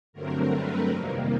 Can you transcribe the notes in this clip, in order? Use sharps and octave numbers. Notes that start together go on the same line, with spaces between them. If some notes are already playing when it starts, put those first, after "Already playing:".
G2 D3 F#3 A3 C4 A#4
B4
F2 C3 D#3 G3 A#3